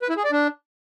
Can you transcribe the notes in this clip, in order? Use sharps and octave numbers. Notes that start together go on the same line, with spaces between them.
B4
E4
G#4
D5
D4